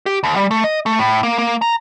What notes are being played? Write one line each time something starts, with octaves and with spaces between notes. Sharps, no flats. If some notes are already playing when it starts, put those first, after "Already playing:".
G4
D#2
G3
A3
D#5
A3
A2
A#3
A#3
A#5